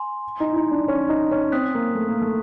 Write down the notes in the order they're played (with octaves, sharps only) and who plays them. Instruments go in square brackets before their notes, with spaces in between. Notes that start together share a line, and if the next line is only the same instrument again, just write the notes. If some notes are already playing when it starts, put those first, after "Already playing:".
Already playing: [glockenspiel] G#5 C6
[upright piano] D#4
E4
D#4
D4
C#4
D#4
C#4
[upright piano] C4 [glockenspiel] D#6 F#6 B6
[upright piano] A#3
A3
A#3
A3